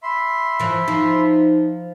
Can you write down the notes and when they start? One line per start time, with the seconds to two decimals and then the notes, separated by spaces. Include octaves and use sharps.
0.03 E5 B5 C6
0.60 E3 F3
0.88 F3 D#4